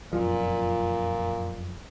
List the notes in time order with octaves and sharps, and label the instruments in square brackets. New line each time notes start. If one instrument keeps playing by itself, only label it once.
[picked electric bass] F1 F#2 F3 [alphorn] A#2